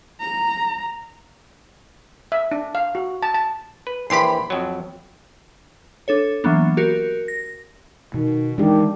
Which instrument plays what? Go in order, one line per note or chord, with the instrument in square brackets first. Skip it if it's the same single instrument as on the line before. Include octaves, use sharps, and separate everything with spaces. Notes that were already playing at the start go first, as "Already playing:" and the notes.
[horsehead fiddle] A#5
[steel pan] E5
D4
F5
F#4
A5
A5
[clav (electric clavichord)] B4
[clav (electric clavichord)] A#1 E3 G4 [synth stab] B5 C6
[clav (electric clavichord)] F2 F#3
[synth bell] D4 A4 C#5
E3 F#3 A#3 B3 D4
F#4 G4 A#4
A#6
[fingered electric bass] B2 [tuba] D#3
[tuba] D#3 [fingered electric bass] E3 G#3 [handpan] D4 G4